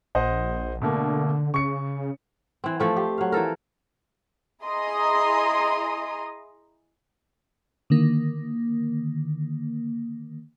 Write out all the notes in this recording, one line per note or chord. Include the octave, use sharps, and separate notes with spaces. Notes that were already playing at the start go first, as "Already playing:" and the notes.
A#1 C5 D#5 F#5
B2 D3 A3 A#3
C#3 C#6 C#7
E3 C4
F3 A3 C4
G4
F#3 F5
E3 F3 A4 A#4
E4 G#4 D#5 A#5 C6 D#6
D3 D#3 A#3